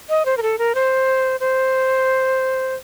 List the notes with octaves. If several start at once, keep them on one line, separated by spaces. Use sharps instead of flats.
D#5
C5
A#4
A4
A#4
C5
C5